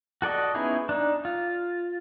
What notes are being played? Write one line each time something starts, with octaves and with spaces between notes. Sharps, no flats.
F#4 A4 D5 D#5
B3 C#4 D#4 E4 G#4
D4 D#4
F4